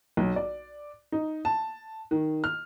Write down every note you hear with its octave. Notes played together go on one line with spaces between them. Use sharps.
B1
D5
D#4
A5
D#3
F6